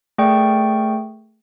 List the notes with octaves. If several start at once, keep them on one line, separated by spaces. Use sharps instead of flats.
A3 G#4 A#4 D5 G5 C#6